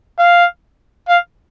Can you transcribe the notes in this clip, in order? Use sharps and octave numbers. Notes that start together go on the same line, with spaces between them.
F5
F5